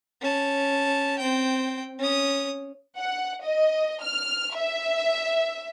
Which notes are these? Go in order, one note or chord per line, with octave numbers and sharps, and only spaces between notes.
C#4 A5
C4 G5
C#4 D#6
F#5
D#5
F6
E5